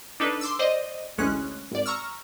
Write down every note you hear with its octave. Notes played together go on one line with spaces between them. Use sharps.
D4 D#4 A4 B4
C6 D6 E6
C5 D5 D#5
A1 D2 G#3 C#4 F#6
G#1 D5
A#5 C#6 E6 F6